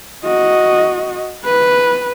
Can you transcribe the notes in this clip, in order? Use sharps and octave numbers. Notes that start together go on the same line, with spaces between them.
F#4 D#5
B4